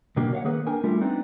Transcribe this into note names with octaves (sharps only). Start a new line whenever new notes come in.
B2 D3 F#3 A#3 D4 G4
C#5 F5 F#5
D#3 A#3 G#4 B4
D4 A#4 G5 G#5
G3 A3 D4 E4 F4
B3 C4 D4 D#4